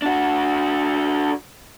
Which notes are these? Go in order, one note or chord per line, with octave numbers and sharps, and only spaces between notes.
D4 F#4